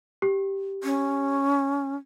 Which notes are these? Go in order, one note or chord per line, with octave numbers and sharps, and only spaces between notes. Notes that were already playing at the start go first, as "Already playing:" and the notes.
G4
C#4